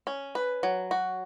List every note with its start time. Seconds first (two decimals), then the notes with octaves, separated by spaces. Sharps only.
0.07 C#4
0.35 B4
0.63 F#3
0.91 F#4